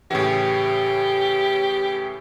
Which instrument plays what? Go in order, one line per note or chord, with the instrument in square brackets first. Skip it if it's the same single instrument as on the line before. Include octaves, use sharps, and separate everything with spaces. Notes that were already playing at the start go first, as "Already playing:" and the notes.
[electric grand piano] A2 C#3 E3 [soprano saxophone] G4